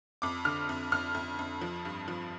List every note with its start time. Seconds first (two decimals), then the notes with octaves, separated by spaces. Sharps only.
0.22 F2 D6
0.45 D3 F6
0.69 F2
0.92 F2 F6
1.14 F2
1.39 F2
1.61 F3
1.85 G2
2.08 F3